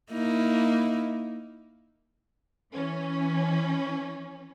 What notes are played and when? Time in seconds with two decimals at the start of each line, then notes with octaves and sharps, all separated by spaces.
0.12 A#3 D#4 E4
2.72 E3 C#4